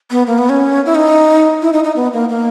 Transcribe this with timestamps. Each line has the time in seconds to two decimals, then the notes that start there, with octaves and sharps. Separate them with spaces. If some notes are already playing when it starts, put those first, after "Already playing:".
0.11 B3
0.27 A#3
0.38 B3
0.49 C#4
0.86 E4
0.95 D#4
1.62 E4
1.73 D#4
1.84 D#4
1.96 B3
2.13 A#3
2.29 A#3